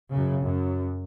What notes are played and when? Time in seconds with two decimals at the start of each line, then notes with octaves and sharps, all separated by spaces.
0.12 F#2 C#3
0.43 F#2